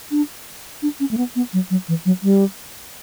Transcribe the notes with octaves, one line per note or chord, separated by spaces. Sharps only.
D4
D4
C#4
A3
B3
B3
F#3
F#3
E3
F#3
G3